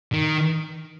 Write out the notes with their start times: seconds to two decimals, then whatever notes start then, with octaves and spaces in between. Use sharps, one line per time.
0.13 D#3